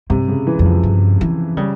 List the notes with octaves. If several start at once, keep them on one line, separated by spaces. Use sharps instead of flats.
G2 C3
C#3
E3
F2
F3
G2
E3
C#3 G3